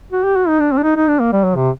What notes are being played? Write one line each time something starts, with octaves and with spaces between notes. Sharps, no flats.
F#4
G4
F#4
D#4
D4
C4
D4
D#4
D#4
D4
A#3
G3
F#3
C3